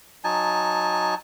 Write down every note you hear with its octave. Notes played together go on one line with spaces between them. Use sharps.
F#3 D#4 G#5 A5